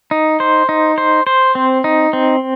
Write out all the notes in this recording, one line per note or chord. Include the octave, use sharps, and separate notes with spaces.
D#4
C5
D#4
C5
C5
C4
D#4
C4